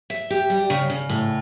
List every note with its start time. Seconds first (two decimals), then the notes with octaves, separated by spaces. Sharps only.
0.10 E5
0.30 G4
0.50 G3
0.70 C#3
0.90 C#3
1.09 A2